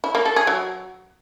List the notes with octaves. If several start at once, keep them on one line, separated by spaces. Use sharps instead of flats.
E4
A#3
A4
G#4
F#3